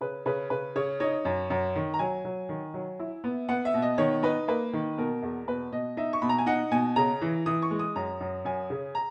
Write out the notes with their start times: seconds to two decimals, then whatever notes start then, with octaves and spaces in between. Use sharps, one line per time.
0.01 C#3 B4
0.26 C#3 B4
0.50 C#3 B4
0.76 C#3 C#5
1.00 D#4 C#5
1.25 F#2
1.50 F#2
1.75 D#3
1.94 A#5
1.99 F#3 G#5
2.25 F#3
2.49 D#3
2.74 F#3
2.99 E4
3.24 B3
3.49 B3 F#5
3.65 E5
3.74 B2
3.82 D#5
3.98 D#3 C#5
4.23 D#4 B4
4.48 A#3 B4
4.73 D#3
4.98 B2 A#4
5.23 E2
5.47 B2 B4
5.72 B2 D#5
5.97 D#4 E5
6.13 C#6
6.22 B2 B5
6.29 A#5
6.38 G#5
6.46 D#4 F#5
6.71 B2 G#5
6.96 C#3 A#5
7.21 E3
7.46 E3 D#6
7.62 C#6
7.71 G#3
7.79 D#6
7.96 F#2 A#5
8.21 F#2
8.45 F#2 G#5
8.70 C#3
8.95 A#5